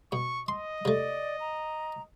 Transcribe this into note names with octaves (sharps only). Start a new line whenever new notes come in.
B2 C#6
D#5 C6
C3 A3 D5
A#5